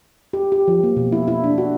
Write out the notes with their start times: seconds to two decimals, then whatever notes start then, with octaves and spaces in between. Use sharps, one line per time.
0.33 G4
0.52 G4
0.68 F3
0.83 A#3
0.97 B2
1.12 E4
1.28 E4
1.44 D4
1.58 F#4